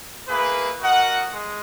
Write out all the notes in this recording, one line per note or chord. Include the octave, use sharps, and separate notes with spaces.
A#3 E4 G#4 B4
F#4 A#4 D#5 F#5
G#3